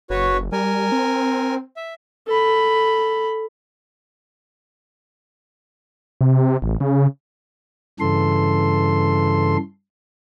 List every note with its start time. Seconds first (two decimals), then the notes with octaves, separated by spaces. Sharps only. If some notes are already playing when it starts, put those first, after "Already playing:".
0.10 F#1 F#4 B4 C#5
0.52 G3 A#4 G#5
0.92 C4
1.77 E5
2.28 A4 B5
6.21 C3
6.62 A1
6.80 C#3
8.00 G2 C#3 E3 A4 C6